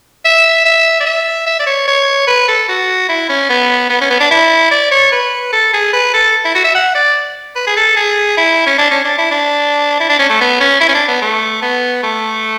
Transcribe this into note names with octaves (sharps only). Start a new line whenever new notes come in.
E5
E5
D5
E5
E5
D5
C#5
C#5
B4
A4
F#4
E4
C#4
B3
B3
C#4
B3
D4
E4
D5
C#5
B4
A4
G#4
B4
A4
E4
F#4
E5
F#5
D5
B4
G#4
A4
G#4
E4
C#4
D4
C#4
D4
E4
D4
E4
D4
C#4
A3
B3
C#4
E4
C#4
D4
B3
A3
B3
A3